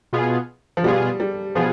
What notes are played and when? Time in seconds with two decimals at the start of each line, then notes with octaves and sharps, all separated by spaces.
0.13 B2 B3 F4 G#4
0.77 F3
0.84 B2 G3 B3 F4 G#4
1.20 G3
1.55 B2 F3 B3 F4 G#4